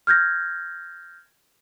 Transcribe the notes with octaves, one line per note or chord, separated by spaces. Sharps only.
F6 G6 G#6 A#6